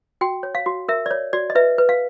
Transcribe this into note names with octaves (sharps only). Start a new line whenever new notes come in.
F#4 G5
C#5
F5
F#4
A#4 E5
D5
C#5
F#4 D5
D#5
B4 E5
B4
F5